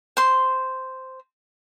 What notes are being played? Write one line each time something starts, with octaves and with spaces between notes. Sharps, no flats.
C5 C6